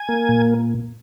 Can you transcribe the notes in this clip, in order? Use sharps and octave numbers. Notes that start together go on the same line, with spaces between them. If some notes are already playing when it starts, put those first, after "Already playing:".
Already playing: G#5
A#3
A#2